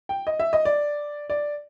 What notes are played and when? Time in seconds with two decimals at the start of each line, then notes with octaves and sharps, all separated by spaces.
0.09 G5
0.27 D#5
0.40 E5
0.53 D#5
0.65 D5
1.30 D5